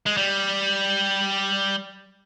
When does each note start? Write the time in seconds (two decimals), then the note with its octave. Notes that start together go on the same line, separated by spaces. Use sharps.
0.06 G#3
0.17 G3